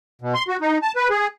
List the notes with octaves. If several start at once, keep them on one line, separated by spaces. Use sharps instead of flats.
B2
C6
F#4
D#4
A5
B4
G#4